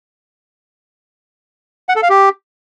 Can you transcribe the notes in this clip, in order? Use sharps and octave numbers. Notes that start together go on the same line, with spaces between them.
F#5
A4
F5
G4